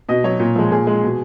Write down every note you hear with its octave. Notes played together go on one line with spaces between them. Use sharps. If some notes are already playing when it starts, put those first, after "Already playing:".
B2 D#5
F#3 C#5
A#2
F3 G#3
A#2 G#4
G#3
B2